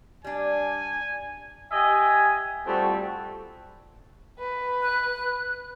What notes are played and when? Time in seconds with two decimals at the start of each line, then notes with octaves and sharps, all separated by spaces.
0.24 G3 D4 G#5
1.72 G4 D#5 E5 G#5
2.67 G3 A3 C4 F4 F#4
4.39 B4
4.82 F#6